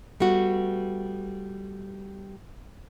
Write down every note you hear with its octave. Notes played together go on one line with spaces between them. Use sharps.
G3 A3 B3 F#4